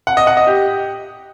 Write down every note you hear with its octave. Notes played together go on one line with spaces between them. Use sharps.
F#5
D#5
F#5
D#5
G4